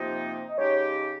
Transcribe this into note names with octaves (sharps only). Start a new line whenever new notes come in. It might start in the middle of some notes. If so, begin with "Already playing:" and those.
Already playing: C3 F3 A#3 D#4 G4
D#5
C#3 G#3 D#4 G4 C#5